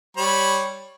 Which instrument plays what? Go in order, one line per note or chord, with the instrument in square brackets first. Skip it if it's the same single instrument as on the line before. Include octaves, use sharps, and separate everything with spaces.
[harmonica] G3 C#5 B5